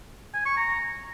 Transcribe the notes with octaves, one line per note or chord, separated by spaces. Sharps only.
G#5
C#6
A#5